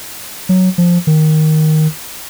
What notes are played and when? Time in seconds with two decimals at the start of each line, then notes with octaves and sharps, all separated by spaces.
0.49 F#3
0.78 F3
1.07 D#3